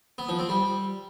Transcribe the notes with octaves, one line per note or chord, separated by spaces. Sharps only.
B3
F3
C4
G3